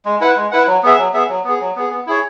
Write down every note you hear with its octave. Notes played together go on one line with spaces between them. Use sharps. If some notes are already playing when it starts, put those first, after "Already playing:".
G#3
E4 B4 F#5
G#3
E4 B4 F#5
F#3
B3 G#4 E5
F#3
B3 G#4 E5
F#3
B3 G#4
F#3
B3 G#4
B3
E4 G#4 C#5